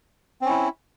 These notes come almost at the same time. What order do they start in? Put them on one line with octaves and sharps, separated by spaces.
C4 C#4 E4